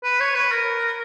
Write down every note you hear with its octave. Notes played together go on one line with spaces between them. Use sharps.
B4
C#5
B4
A#4